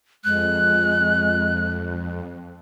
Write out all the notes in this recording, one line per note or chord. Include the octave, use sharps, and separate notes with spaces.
F2 G#3 F#6